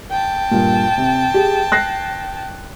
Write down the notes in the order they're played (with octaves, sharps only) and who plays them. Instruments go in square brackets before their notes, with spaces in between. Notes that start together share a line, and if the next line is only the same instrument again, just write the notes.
[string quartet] G5 A5
[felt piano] G2 A#2
C3
G4 G#4
F#6 A#6 C7